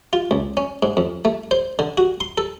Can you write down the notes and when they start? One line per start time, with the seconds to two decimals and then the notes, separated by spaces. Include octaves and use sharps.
0.13 F4
0.31 C#2
0.57 C#4
0.83 G#2
0.97 F2
1.25 A3
1.51 C5
1.79 D3
1.98 F#4
2.20 C6
2.38 A4